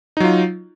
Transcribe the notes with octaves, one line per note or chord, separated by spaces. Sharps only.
F#3 D#4 F4